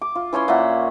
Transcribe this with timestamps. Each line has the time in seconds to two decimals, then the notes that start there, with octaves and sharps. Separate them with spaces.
0.02 D6
0.15 F4
0.33 E3 C#4 C#5 C6
0.48 A#2 A#3 E5 F#5